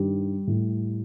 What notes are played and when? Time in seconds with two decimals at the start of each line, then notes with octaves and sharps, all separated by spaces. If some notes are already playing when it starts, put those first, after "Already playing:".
Already playing: G2 D#3 G3
0.47 A2